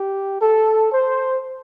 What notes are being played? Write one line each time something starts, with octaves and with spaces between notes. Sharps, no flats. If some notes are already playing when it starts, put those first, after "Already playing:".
Already playing: G4
A4
C5